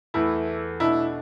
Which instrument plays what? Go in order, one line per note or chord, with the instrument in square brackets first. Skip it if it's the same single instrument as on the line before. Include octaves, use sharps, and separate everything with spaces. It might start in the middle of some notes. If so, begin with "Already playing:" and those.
[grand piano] E2 E3 A3 [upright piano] E4
[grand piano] B2 A3 D4 [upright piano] E4